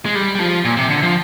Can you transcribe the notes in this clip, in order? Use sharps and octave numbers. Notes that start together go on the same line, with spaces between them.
G#3
G3
G3
F3
A#2
C3
D3
F3